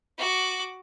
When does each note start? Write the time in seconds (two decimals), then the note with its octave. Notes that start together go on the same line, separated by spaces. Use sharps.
0.18 F#4 D6